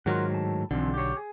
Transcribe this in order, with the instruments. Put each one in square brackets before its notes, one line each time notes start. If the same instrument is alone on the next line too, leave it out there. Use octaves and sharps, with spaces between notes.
[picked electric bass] G#2 D#3 F#3 [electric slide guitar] F4 A#4 F#5
[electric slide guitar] A2 A5
[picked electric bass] B1 D3 [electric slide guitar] E3 F3 C4
[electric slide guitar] G4 C#5
G#4